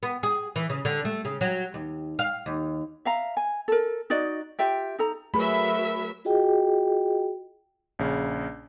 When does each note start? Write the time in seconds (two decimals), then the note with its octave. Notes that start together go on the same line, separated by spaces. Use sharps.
0.03 B3
0.23 G#4
0.56 E3
0.70 C#3
0.85 D3
1.05 A3
1.25 C#3
1.41 F#3
1.74 D#2
2.19 F5
2.46 D#2
3.05 E5 F5 A#5
3.37 G#5
3.68 A4 A#4
4.10 D#4 F#4 D5 D#5
4.59 F4 G4 E5 G5
4.99 D#4 A4 A#5
5.34 F#3 A3 G#4 A#4 B4 E5 B5
6.25 F4 F#4 G#4 D#5 G5
7.99 A#1 C#3